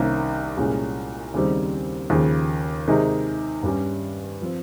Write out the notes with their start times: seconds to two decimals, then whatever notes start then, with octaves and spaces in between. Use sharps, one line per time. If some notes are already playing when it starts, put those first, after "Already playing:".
Already playing: C2 C3 D#3 A#3 C#4
0.57 C2 A#2 G#3 C#4
1.34 D#2 C#3 G3 C4 D#4
2.10 D#2 C#3 F3
2.87 C3 D#3 G#3 D#4
3.63 G2 G3 C#4
4.42 F3 C4